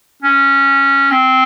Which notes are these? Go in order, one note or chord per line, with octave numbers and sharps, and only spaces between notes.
C#4
C4